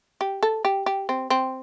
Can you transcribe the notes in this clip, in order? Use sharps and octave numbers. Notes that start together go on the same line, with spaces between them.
G4
A4
G4
G4
C4
C4